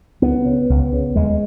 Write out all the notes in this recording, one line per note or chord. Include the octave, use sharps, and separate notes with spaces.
C#2 B3
C#3
C#2
C#3
D#2 G#3